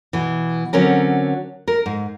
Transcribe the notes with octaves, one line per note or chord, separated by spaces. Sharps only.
B2 E3
D3 F#3 C4 C#4 A#4
A#4
G#2